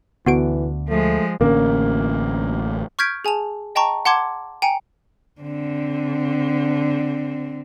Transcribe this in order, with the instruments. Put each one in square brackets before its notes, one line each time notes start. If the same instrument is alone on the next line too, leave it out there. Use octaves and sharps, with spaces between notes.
[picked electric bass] D2 D3 [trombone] E3 [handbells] B3 F#4 D7
[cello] F3 G#3 [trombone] A3
[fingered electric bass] A1 D3 C#4 [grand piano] A#3
[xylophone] C#6 F6 G6 G#6 B6 D7
G#4 G#5 A5 F7
D#5 G5 A5 A#5 C#6
F#5 A5 C6 D6 G#6
G5 G#5 A#5 C#7
[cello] D3 C4